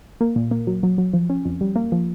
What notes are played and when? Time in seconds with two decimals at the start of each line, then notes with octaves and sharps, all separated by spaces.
0.21 A#3
0.36 A#2
0.51 A#3
0.67 F#3
0.83 F#3
0.98 F#3
1.13 F3
1.29 C#4
1.45 F2
1.61 G3
1.76 A#3
1.92 F3